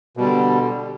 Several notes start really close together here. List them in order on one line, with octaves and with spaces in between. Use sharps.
B2 G3 D3